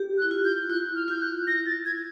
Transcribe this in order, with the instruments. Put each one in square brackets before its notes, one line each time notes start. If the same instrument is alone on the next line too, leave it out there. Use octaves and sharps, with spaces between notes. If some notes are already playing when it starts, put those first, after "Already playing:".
Already playing: [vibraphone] G4
[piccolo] F#6
[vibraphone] E4
F4
[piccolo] G6
[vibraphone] E4 [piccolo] F#6
[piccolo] F6
[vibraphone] F4 [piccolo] G6
[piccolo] F#6
[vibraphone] E4 [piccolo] A#6
[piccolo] A6
G#6